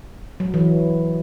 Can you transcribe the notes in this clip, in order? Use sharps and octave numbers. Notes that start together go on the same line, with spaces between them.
F#3
E3